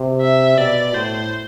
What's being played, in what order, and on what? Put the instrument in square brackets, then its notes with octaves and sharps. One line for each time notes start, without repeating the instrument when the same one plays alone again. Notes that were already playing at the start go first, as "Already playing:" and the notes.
Already playing: [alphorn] C3
[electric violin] E5
[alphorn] B2 [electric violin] D5
[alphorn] A2 [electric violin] C5